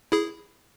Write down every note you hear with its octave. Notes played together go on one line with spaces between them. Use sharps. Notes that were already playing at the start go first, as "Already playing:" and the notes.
E4 G#4